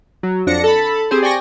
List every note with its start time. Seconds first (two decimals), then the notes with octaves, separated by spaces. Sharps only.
0.23 F#3
0.47 F2 D4 A#6 C#7
0.64 A4 A5 B5
1.11 C4 G4 G#4 C5
1.22 D5 G5 G#5 C#6 A#6